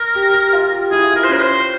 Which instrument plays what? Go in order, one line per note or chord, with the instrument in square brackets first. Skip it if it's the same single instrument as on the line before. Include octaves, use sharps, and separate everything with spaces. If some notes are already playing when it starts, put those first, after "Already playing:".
Already playing: [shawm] A#4
[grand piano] G4
G4
F4
G4
[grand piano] E4 [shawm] G#4
[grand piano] F4
[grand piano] E4 [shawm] A#4
[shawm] C5
[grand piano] C#4 [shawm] A#4
[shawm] C5